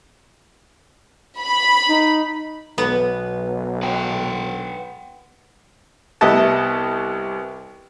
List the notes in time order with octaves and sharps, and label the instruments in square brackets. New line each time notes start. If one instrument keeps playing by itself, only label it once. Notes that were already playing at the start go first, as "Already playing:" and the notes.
[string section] B5
[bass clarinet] D#4
[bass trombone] B1 [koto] B3
[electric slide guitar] B4 F#5 G5
[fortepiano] C2 B3 G4 D#5 E5 A5